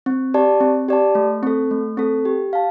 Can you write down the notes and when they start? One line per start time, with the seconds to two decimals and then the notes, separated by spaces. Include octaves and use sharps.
0.06 C4
0.34 G4 D5 A5
0.60 C4
0.88 G4 D5 A5
1.15 A3
1.43 C4 A4
1.71 A3
1.97 C4 A4
2.25 G4
2.53 F5 A5